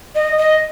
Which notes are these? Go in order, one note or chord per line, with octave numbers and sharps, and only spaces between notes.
D#5
D#5